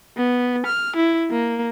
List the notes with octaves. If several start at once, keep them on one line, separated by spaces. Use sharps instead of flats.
B3
F6
E4
A#3